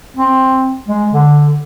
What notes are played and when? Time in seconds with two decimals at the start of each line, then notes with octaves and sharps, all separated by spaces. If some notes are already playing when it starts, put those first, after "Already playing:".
0.17 C4
0.89 G#3
1.12 D3